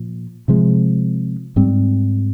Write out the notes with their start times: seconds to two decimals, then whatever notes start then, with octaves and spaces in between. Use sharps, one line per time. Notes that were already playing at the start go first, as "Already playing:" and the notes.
Already playing: A#2 F3
0.48 C3 F3 G#3
1.56 G#2 G3 C4